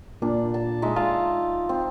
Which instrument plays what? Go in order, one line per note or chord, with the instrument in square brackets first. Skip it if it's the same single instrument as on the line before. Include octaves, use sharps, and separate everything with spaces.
[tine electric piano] A#2 [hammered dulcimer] D4
[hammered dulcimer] A5
G#3 D#4 E5
[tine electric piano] F4 [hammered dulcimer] A5
[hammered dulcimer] C4